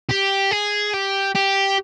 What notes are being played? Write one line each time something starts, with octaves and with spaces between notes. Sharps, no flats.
G4
G#4
G4
G4